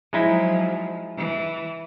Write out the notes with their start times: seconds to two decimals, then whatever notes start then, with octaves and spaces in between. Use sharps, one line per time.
0.13 F3 F#3 G#3 D#4 E4
1.17 E3